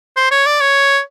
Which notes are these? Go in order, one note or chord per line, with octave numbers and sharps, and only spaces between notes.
C5
C#5
D5
C#5